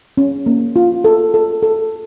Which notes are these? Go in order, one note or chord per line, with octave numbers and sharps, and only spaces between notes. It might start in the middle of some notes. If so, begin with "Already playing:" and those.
C#4
A#3
F4
A4
A4
A4